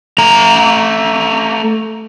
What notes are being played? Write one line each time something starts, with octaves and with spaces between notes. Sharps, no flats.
A3 A#5